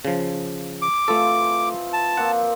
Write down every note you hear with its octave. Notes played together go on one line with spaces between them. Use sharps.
C#3 F3
D6
E3 F3 A3 C4 A4
A5
F3 A#3 C4 F#5